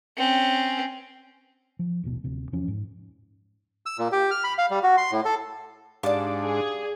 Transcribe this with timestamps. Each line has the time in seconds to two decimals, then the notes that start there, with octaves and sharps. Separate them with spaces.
0.17 C4 C#4
1.79 F3
2.03 D#1 A1 B2
2.24 D1 C3
2.52 E2 F3 C#4
2.68 G#2
3.86 E6
3.98 A#2
4.12 G4
4.31 F6
4.44 B5
4.58 F5
4.70 G3
4.83 F#4
4.97 C6
5.11 A2
5.25 A4
6.03 G#2 D4 G4 D5 F5 F#5 A5
6.44 G#4